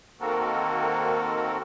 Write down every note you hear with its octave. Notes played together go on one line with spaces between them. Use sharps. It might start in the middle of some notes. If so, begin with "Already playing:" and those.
D#3 A#3 C4 F#4 A4 A#4